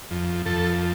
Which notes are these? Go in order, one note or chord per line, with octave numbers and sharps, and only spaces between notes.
F2
F2 A4